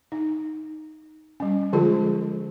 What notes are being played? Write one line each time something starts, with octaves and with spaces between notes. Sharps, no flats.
D#4
G3 C#4
D3 F3 G#3 F4 G#4 C5